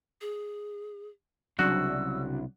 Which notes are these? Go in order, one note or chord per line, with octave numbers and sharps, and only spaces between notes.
G#4
C2 C#3 F#3 D4 F#4 E6